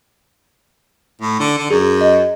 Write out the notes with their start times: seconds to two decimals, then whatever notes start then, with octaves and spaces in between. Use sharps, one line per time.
1.21 A2
1.40 D3
1.58 D3
1.70 F#2 G#4
2.01 D#5